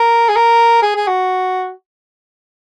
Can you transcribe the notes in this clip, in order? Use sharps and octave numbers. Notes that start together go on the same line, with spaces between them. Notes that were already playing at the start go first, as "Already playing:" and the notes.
Already playing: A#4
G#4
A#4
G#4
G#4
F#4